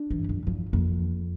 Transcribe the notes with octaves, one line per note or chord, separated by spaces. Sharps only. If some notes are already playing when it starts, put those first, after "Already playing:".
Already playing: D4
E3
G2
F2
E2 F3
F2 A#3
E2